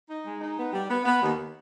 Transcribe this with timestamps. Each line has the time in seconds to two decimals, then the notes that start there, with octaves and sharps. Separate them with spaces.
0.09 D#4
0.25 G#3
0.41 D#4
0.58 B3
0.73 G3
0.89 B3
1.05 B3
1.21 D#2